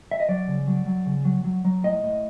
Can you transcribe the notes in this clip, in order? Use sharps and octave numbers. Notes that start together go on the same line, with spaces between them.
E5
D#5
F#3 D5
C#3
F#3
F#3
C#3
F#3
F#3
F#3
A2 D#5
A2